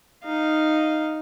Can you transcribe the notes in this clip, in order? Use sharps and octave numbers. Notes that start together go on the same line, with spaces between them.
D#4 F5